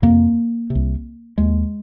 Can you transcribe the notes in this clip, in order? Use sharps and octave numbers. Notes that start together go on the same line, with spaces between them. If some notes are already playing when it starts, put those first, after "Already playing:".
F2 C3 A#3
C3
C2
D#2 G#3